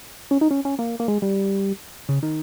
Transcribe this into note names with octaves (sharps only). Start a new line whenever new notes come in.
C#4
D#4
C#4
C#4
A#3
A#3
G#3
G3
C#3
D#3